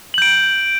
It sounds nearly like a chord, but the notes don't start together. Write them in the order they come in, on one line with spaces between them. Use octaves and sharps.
F#7 G6 D7